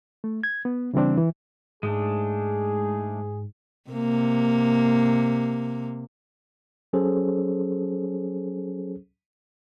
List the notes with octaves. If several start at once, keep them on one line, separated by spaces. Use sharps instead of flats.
A3
G#6
B3
C#3 E3 G3 C4 D4
E3
G#2 G#3 A3 D4 G#4
C3 A#3
F#3 C#4 G#4 A4 C5